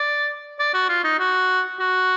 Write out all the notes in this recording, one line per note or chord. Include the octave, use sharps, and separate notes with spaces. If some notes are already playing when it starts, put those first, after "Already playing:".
Already playing: D5
D5
F#4
F4
D#4
F#4
F#4